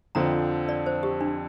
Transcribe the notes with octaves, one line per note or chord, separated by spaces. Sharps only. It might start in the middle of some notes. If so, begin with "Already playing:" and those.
F2 D3 F3 C4 A#5
D5
C5
G4
D4